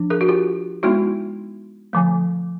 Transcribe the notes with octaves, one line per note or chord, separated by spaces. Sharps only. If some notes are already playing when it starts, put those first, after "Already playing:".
Already playing: F3 D4
G#4 A#4
F#4
F4 G4
G#3 B3 D#4 E4 F#4
D3 F3 A3